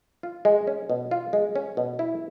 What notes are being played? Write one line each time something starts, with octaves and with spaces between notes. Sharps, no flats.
F4
G#3
C#4
B2
F4
G#3
C#4
B2
E4